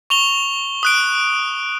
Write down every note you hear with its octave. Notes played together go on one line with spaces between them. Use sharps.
C#6 F7 G7
D#6 F#6 D7